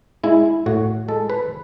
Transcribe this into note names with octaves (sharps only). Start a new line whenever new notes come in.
G#3 E4
A2 F#4
G#3 A4
B4